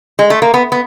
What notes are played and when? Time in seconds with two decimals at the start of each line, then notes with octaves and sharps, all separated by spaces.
0.19 G#3
0.30 A3
0.42 A#3
0.54 B3
0.72 B3